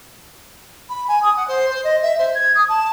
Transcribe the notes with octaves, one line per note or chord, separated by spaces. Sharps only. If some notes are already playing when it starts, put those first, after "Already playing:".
B5
G#5
D#6
F#5
C5
C5
D#5
E5
C5
G#6
D#6
A5